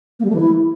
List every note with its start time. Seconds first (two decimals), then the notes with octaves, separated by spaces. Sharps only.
0.19 A#3
0.25 G3
0.30 A3
0.35 E3
0.40 E4